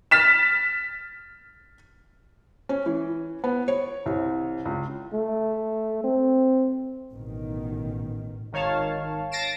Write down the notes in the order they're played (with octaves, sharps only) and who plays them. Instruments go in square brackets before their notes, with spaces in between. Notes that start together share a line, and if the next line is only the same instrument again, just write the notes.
[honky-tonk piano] F6 A6 B6 E7
[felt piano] C#4
E3
B3
C#5
C2
C#2
[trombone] A3
C4
[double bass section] A1 B2 D#3
[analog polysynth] G#1 D#3 C#5 F5 A5
A6 A#6 C7 D7 E7